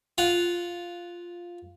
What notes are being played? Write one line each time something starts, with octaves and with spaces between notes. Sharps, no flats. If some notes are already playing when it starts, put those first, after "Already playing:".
F4 F#5